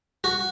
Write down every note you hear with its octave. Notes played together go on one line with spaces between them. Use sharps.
F#4